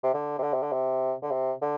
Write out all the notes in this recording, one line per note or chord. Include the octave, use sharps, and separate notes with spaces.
C3
D3
C3
D3
C3
D3
C3
D3
C3
D3